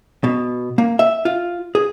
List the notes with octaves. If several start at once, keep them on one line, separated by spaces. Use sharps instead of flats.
B2
A#3
E5
F4
G#4